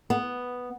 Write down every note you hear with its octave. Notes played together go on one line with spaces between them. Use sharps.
B3